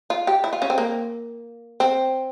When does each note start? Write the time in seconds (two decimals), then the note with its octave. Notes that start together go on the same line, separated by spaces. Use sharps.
0.10 F4
0.27 G4
0.44 E4
0.53 F4
0.62 C#4
0.70 C4
0.78 A#3
1.80 C4